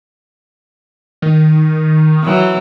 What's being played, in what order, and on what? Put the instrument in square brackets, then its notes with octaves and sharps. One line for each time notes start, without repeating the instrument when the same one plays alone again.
[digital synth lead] D#3
[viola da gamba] E3 F#3